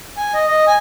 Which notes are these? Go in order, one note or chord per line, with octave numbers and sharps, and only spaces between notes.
G#5
D#5
D#5
G#5